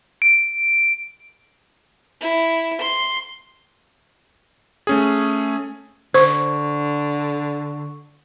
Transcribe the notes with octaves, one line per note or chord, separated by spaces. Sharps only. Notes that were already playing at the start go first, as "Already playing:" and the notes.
D7
E4
C6
A3 C#4 G#4
D3 C5 C#6